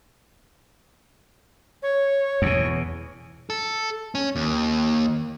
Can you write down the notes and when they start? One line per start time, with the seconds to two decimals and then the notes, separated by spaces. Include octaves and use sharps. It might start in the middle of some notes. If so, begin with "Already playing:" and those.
1.82 C#5
2.42 E2 B2
3.50 A4
4.15 C#4
4.36 D#2